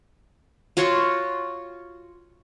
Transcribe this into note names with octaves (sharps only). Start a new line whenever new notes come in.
F4 F#4 C#5 C6